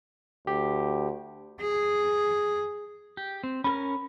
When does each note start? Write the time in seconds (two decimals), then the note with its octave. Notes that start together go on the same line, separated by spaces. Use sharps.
0.47 D2 G4
1.61 G#4
3.17 G4
3.44 C4
3.64 C#4 A4 A#4 B5